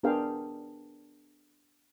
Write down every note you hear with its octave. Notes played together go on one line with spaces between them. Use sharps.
B3 D4 G#4 A#4 F5 G5